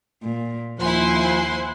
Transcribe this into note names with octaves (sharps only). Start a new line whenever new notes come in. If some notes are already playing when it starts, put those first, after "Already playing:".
A#2
D#2 F3 E4 C5 F#5 G#5 C6